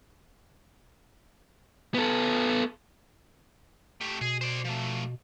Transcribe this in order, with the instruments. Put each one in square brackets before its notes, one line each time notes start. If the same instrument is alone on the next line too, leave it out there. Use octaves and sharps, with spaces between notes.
[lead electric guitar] B3 A4
[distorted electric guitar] A3 G4
[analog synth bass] B2 [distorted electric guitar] G#4
[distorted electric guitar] C5 D5
F3 A3